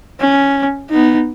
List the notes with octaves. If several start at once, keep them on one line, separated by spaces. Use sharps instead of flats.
C#4
B3 D#4